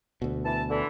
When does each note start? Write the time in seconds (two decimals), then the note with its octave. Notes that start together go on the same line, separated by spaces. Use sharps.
0.22 D2 B2
0.45 E3 A5
0.70 D3 E3